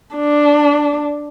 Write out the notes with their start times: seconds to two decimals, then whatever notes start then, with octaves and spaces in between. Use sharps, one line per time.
0.15 D4